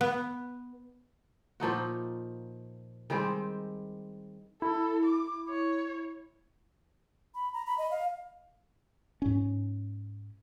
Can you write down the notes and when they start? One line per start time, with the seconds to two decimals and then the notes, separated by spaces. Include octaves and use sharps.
0.01 B3
1.60 A#2 F3 D#4 F#4
3.10 D#3 G3 G#3 C4
4.62 E4 A4
5.05 D6
5.49 C#5
7.35 B5
7.53 A#5
7.66 B5
7.78 D#5
7.91 F5
9.22 G#2 C#4